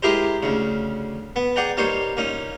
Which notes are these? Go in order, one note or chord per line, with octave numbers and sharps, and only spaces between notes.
G#3 E4 G4 G#4 A#4 C5
D2 C#3
B3
G#4 D5 F#5 G5 A#5
G3 A#3 D#4 C5 C#5
A#2 C#4 D#4